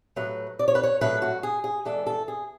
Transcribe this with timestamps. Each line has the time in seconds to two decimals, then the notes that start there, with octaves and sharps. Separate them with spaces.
0.16 A2 F#3 A3 B4
0.59 D5
0.68 C#5
0.75 B4
0.83 C#5
1.01 A2 F#3 A3 B4
1.22 F#4
1.43 G#4
1.64 G#4
1.85 E3 G#3 B3 D4 A4
2.07 A4
2.28 G#4